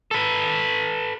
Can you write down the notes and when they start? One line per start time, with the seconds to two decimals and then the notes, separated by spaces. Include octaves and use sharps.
0.11 A4 B4